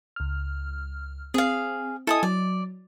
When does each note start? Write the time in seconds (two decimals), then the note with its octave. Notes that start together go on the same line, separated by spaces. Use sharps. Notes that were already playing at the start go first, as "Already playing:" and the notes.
0.16 C#2 F6
1.34 C4 G#4 F5
2.07 E4 A4 D#5 G#5 D#6
2.23 F#3 D5